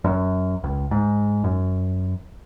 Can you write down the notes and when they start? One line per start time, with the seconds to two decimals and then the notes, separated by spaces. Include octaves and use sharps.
0.04 F#2
0.64 C#2
0.91 G#2
1.44 F#2